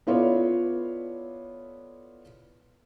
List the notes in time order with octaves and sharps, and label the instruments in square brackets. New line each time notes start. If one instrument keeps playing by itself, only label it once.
[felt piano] B3 E4 F4 A4 C#5 D5